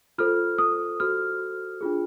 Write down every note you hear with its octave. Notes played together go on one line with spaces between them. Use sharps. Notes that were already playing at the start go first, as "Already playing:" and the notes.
F4 A4 C5 F6
D#6
F#4 A4 C5 F6
D4 F4 G#4